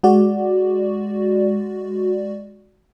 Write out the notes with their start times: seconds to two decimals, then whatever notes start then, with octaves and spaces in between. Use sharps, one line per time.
0.03 G#3 F#4 D5